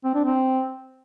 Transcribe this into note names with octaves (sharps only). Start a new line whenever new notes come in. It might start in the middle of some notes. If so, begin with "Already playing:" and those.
C4
D4
C4